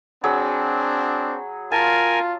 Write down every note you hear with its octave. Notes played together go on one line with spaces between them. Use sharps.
F#3 C4 D4 G#4 B5
F4 A#4 G#5 A5